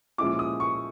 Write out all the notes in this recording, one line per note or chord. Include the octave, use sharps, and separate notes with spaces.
A#2 F3 G#3 C#4 E4 D6
D#6
C#6